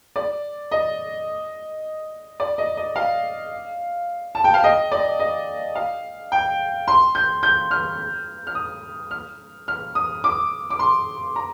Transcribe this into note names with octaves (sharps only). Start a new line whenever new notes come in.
D5
D#5
D5
D#5
D#5
F5
A5
G5
F5
D#5
D5
D#5
F5
G5
C6
G6
G6
F6
F6
D#6
F6
F6
D#6
D6
D6
C6
A#5